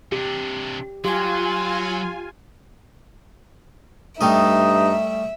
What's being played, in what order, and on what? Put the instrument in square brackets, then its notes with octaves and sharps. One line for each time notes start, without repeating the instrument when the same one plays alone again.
[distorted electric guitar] C3 D4 [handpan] G4
[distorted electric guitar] F#3 [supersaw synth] F4 G#5 [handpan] G4 [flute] C6
[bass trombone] G2 [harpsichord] G3 A3 D#5 [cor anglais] D#4 [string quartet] E5